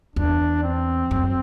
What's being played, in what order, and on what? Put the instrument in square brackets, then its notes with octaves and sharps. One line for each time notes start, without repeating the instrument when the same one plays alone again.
[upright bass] E2 [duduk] D4
[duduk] C4
[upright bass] F#2